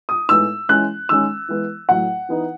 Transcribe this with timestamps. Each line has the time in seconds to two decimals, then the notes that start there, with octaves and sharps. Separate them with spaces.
0.09 D#6
0.28 A2 G#3 B3 D#4 E6
0.69 E3 G#3 C#4 F#6
1.09 D#3 G#3 C#4 E6
1.49 E3 G#3 B3
1.89 A2 F#3 A3 F#5
2.29 E3 B3 D#4